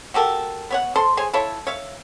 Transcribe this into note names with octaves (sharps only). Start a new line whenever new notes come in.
F#4 G4 A4 A#4
B3 C#5 F#5
A4 C5 C6
G#4 C5 C#5 G#5
E4 F4 A4 C#5
C#5 E5 F5